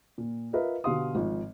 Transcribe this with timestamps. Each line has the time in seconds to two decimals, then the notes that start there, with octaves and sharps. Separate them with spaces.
0.18 A#2
0.53 F4 A#4 B4 D#5 E5
0.84 B2 D3 G4 F5 C6 D#6
1.15 G#1 F3